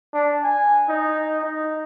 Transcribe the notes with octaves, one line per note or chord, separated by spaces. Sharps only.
D4
G#5
D#4
D#4